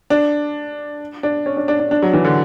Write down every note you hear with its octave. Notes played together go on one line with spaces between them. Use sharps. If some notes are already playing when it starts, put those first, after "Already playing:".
D4
D4
C#4
D4
D4
D4
D4
F#3
E3
D3